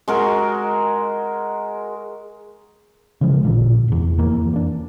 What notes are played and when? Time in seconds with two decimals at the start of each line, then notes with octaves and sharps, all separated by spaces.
0.08 G#3 F#4 A#4
3.21 C#3 E3 F3 G#3
3.43 A1 A#2 D3
3.88 F1 E2
4.19 F2 E3 A#3
4.53 A#3 D4